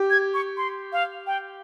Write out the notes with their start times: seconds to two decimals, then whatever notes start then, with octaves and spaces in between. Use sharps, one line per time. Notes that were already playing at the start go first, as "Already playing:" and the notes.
Already playing: G4
0.10 G#6
0.34 C#6
0.57 C6
0.93 F5
1.27 G5